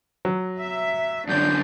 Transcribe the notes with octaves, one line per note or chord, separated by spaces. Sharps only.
F#3
E5
F#2 D3 C#4 D4 G6